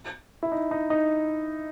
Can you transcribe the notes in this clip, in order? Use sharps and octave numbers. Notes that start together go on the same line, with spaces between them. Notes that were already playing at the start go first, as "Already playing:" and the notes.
E4
D#4
D#4
D#4